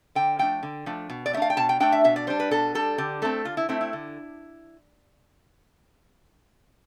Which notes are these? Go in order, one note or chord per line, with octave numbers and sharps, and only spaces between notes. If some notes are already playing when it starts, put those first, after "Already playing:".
D3 G5
F3 A3 D4 G5
D3
F3 A3 D4
B2
D5
A3 D4 E5 F5
G5
B2 A5
G5
A3 D4 G5
E5
B2 E5
D5
G3 D4 C5
B4
B2 A4
G3 D4 A4
D3 G4
A3 C4 A4
D3 F4
E4
A3 C4 E4
E4
D3